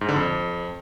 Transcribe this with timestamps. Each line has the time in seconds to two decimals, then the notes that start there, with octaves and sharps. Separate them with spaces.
0.01 G#2
0.09 D3
0.16 F2